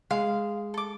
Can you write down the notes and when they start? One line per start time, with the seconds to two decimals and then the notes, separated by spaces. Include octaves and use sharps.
0.11 G#3 F5
0.74 A4 D6